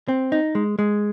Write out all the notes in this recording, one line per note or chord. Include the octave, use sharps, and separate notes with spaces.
C4
D#4
G#3
G#3